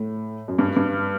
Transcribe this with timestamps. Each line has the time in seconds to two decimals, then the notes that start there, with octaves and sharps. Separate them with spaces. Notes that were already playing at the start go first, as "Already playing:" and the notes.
Already playing: A2
0.48 F#2
0.59 G2
0.76 G2